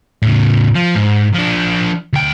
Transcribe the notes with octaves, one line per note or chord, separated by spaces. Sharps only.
A2 C#3
F3
G#2
F3 D4
D2 G5